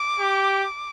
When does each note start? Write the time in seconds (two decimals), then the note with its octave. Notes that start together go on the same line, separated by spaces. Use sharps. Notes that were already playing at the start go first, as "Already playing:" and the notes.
Already playing: D6
0.19 G4